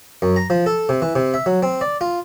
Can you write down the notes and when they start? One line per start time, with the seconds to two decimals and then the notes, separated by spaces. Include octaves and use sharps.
0.22 F#2
0.36 A#5
0.50 F3
0.66 A4
0.89 C3
1.02 E3
1.15 C3
1.34 E5
1.46 F#3
1.63 C4
1.81 D5
2.01 F4